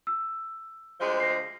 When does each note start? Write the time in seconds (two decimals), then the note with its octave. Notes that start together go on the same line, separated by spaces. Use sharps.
0.07 E6
1.00 D2 F3 G#3
1.20 A#6 C7